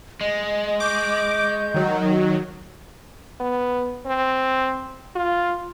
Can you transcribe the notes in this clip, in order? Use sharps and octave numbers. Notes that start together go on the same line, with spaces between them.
G#3 D#5
C#6 D6 G6
D#3 F#3
B3
C4
F4